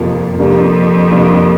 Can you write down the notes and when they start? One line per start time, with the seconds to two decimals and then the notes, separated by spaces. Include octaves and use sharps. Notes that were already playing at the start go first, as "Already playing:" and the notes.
Already playing: F2 C3 F3 A#3
0.38 F2 C3 G3 A#3 D4
1.10 C3 G3 A#3 D4